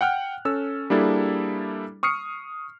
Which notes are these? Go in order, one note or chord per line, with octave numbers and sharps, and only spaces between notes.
F#5 G5 F6 F#6
C#4 A4 E6
G3 A#3 D4 E4 G#4 A4
C#6 D#6 F6 C7 C#7